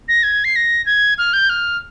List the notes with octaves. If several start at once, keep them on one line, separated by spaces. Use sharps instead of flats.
A#6
G#6
C7
A#6
G#6
F6
G6
F6